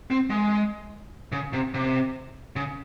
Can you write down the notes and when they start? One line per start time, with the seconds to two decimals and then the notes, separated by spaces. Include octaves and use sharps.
0.10 C4
0.30 G#3
1.32 C#3
1.53 C3
1.74 C3
2.56 C#3